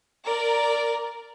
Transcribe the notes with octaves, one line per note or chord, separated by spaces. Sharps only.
A#4 D5